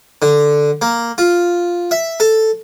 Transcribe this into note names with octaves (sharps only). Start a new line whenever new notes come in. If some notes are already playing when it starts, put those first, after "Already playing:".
D3
A#3
F4
E5
A4